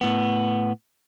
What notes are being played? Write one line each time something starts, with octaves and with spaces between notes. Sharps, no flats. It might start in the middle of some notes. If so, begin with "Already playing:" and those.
A2 B3